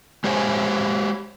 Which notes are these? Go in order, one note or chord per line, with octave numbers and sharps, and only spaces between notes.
G#3 G4 C5 C#5 F5 G#5